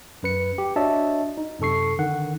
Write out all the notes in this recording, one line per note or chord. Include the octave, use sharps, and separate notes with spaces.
F#2 B4 C#7
G4
D4 F#4 C#5 D#5 E5 A5
D#4
F#2 C3 A4 C#6 C7
D3 D#3 F#5